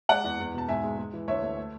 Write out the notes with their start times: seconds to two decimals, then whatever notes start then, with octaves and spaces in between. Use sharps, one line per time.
0.09 G#3 D5 F#5
0.24 E2
0.39 E2
0.54 B2 A5
0.68 G#2 E5 G#5
0.83 G#3
0.98 G#3
1.13 E3
1.28 D2 C#5 E5
1.42 A3
1.57 A3